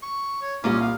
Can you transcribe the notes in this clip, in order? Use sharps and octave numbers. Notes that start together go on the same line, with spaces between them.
C#6
C#5
C2 A#2 C#4 F4 A#4 D#5 D6
F5